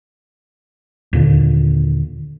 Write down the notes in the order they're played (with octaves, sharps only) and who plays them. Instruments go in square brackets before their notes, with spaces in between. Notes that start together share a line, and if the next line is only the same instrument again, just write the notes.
[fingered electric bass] D#2 A#2 D3